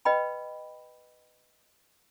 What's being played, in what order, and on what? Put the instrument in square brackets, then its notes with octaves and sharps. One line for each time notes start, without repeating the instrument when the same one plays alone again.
[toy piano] B4 D#5 G5 B5